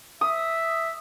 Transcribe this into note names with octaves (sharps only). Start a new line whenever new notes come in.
E5 D#6